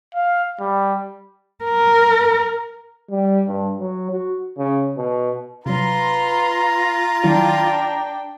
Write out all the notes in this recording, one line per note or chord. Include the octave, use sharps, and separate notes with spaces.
F5
G3
A#4
G3
G2
F#3
F#4
C#3
B2
C3 F#3 F4 B4 A#5 C6
D#3 F#3 D4 E4 G5